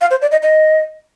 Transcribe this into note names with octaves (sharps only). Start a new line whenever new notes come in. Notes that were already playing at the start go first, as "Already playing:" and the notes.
F5
C5
D5
D#5
D#5